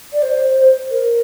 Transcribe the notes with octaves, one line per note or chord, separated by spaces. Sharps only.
D5
C5
A#4